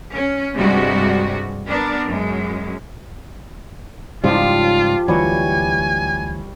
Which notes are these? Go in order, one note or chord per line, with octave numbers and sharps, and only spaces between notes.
C#4
G2 C3 G3 G#3 F#4
B3 D4 A#4
F#2 G#3
G#2 C#3 F3 G3 F4 G4 A5
D2 E3 F#3 G3 G#5 C#6